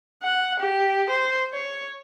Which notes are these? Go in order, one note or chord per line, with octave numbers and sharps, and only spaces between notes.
F#5
G4
C5
C#5